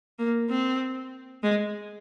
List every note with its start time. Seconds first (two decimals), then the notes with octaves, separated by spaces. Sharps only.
0.19 A#3
0.50 C4
1.43 G#3